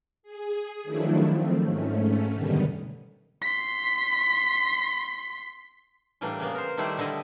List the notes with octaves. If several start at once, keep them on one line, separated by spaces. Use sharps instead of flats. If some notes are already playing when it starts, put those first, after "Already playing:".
G#4
D#3 F3 F#3 A3 D4 E4
D#3 F3 A3 C4
G#2 A3 C#4
F#2 B2 D3 D#3 G3
C6 B6
A2 E3 G3 A#3 D4
C#3 A#3 B3
A#4 C5
D#3 G3 A3 E4 C5 D5
B2 D3 G3 E4 D#5